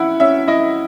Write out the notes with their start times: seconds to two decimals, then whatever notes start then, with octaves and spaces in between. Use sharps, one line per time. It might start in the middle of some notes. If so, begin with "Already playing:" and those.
Already playing: C#4 E4 F#5
0.20 C#4 E5
0.47 E4 D#5